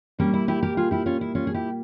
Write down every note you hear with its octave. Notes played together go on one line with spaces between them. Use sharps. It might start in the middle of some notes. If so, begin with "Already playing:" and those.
A#2 G3 A#3 C#4
E4
E4 G4
G4 A#4
F4 G#4
E4 G4
C#4 F4
E4
C#4 F4
G#4
E4 G4